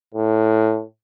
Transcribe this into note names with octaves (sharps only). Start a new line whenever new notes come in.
A2